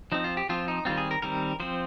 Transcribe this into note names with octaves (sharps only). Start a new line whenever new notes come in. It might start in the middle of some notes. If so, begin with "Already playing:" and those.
F3 C4 D#4
F4
G4
F3 C4 F4
D#4
D#3 G3 C4 F4
G#4
A#4
D#3 G3 C4 A#4
F3 C4 C5